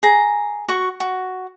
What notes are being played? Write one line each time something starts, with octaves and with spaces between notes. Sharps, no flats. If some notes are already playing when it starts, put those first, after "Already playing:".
G#4 A#5
F#4 C#6
F#4